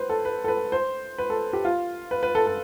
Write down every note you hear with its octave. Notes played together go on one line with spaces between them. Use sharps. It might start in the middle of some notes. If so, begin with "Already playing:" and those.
Already playing: B4 C5
A4
B4
A4
B4
C5
B4
A4
G4
F4
B4
B4
A4
A4